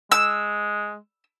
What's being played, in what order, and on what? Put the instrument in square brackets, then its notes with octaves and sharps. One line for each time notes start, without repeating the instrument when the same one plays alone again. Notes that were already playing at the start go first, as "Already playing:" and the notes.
[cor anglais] G#3 [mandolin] E6